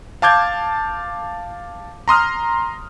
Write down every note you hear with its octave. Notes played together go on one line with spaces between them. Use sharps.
F5 A5 D6 G6 G#6
A#5 C6 D#6 F6